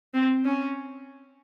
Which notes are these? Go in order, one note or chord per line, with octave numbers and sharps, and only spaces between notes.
C4
C#4